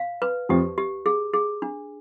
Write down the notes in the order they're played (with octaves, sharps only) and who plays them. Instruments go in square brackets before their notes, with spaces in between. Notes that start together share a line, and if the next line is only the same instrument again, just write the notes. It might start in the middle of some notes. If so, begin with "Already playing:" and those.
Already playing: [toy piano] F5
B4
[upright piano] F2 F3 [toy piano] G4
[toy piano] G4
G#4
G#4
D4